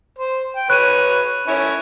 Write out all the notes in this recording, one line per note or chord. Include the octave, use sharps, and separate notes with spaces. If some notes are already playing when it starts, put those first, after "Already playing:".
C5
G5
B4 C#5 F#6 D#7
C#4 E4 C#5